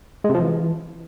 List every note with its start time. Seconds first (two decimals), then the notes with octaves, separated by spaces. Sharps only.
0.24 G#3
0.29 C3
0.34 F3
0.40 E3